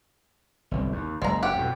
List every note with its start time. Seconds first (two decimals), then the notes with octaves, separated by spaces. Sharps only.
0.71 G1 C2
0.92 D#2
1.22 F#1 G#3 A#5
1.43 G4 F#5
1.56 F2 B2